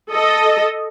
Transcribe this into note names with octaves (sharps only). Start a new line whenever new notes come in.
A4 D#5